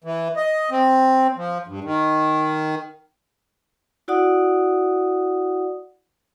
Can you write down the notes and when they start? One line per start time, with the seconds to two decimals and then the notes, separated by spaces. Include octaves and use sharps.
0.04 E3
0.36 D#5
0.71 C4
1.37 F3
1.67 G2
1.84 D#3
4.08 E4 F#4 D5 F#5 D#6